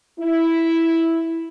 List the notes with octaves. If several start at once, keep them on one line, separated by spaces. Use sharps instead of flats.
E4